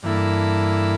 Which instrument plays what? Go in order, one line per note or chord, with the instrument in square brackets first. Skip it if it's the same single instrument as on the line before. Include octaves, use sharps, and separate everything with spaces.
[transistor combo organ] G2 E3 A#3 E4 A4